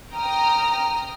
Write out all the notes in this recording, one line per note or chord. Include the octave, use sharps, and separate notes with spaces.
G5 A#5 D#6 F6